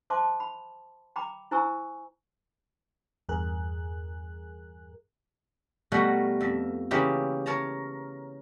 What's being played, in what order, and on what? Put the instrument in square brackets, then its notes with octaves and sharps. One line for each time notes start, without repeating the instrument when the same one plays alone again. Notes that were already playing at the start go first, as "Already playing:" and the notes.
[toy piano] C5 E5 A5 C6 D6
B5
G5 A#5 B5 D6
E4 C5 G#5 A#5 C#6 E6
[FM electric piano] E2 G2 G#4 A#4 F#6
[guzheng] B2 G3 A3 B3 F#4 A#4
F2 E5
C#3 E3 A#3 E4 G4
A#4 C#5 A5 A#5